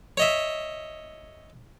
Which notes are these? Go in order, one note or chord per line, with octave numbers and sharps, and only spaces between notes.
C#5 D#5 E5